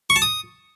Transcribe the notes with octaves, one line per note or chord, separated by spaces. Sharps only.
C#6
A5
D#6